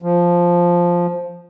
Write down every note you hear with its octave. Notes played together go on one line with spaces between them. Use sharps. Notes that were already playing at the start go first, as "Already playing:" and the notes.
F3